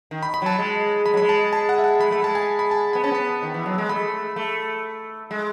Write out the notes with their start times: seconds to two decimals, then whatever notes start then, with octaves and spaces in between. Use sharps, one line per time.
0.11 D#3
0.23 B5
0.34 B5
0.42 F#3 A5
0.59 G#3
1.06 G#3 B5
1.14 F#3
1.17 G#3 B5
1.29 A5
1.53 A5
1.69 F#5
1.78 E5
1.84 F#5
2.00 G#3 B5
2.11 A3 B5
2.22 G#3 A5
2.35 G#5
2.59 B5
2.71 A5
2.93 B3 B5
3.04 C#4 A5
3.11 B3 B5
3.43 D#3
3.54 E3
3.66 F#3
3.78 G#3
3.89 A3 B5
4.36 A3
5.31 G#3